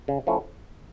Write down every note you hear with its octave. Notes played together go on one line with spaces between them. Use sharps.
C#3
F3 A3 C#4 E4